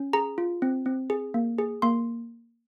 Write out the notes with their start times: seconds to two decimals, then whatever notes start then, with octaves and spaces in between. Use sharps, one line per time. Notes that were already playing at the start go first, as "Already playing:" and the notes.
Already playing: C#4
0.13 G#4 A#5
0.38 F4
0.62 C4
0.86 C4
1.10 G#4
1.34 A#3
1.58 G#4
1.82 A#3 C6